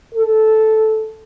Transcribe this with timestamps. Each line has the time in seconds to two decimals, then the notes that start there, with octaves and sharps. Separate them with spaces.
0.14 A4